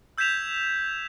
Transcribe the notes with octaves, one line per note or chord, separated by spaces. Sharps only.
E6 G6 G#6 B6 E7 F7